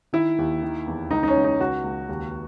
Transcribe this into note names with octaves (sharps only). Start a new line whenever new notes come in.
D#3 E4
D#2
D#3
E2
C#2 D#4
D#4
C#4
C#2
D#4
C#2 F#4
C#2
D#2